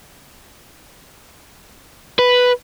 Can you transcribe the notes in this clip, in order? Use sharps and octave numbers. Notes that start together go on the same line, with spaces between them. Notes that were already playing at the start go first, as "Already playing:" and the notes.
B4